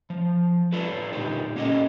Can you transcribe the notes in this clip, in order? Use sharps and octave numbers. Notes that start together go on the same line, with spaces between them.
F3
D4 F4 A4 B4
A#2 D3 D#4 G4
A#3 C#4 G4 A4 D#5